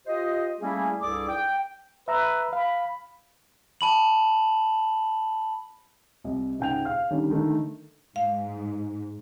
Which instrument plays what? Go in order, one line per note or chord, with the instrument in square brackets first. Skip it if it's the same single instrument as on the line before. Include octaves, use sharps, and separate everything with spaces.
[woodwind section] F4 G4 C5 D#5
G3 A3 A#3 C#4 E4 G#4
C2 G2 G#4 A4 D5 D6
G5
[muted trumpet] B4 [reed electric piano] E5 A#5 E6
[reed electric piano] F5 [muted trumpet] B5
[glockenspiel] A5 B5 F#7
[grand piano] C2 G3 D#5
C#2 G#2 F#5 G5 G6 F7
F5 F6
D3 D#3 G3 C#4
D3 D#3 A3
[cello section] G#2 [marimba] F5